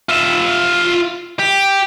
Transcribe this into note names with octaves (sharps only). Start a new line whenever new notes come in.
F4 E5
G4